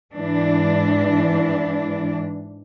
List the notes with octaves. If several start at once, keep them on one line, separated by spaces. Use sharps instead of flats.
G#2 E3 D4